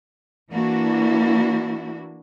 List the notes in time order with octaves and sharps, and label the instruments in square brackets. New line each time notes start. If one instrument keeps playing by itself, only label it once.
[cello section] E3 A#3 D4 E4 F#4